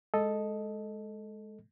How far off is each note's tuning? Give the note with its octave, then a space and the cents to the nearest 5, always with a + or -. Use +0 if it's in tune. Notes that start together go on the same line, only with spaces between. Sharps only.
G#3 +15 A4 -5 D#5 +0